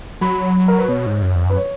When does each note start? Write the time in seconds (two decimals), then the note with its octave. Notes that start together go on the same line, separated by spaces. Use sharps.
0.21 F#3 B5
0.68 A#4
0.79 B4
0.89 B2 C#5
1.06 G#2
1.22 F#2
1.35 F2
1.46 F#2 B4
1.57 C#5